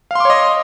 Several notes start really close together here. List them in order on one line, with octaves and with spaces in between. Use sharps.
F5 C6 D6 C#5 D#5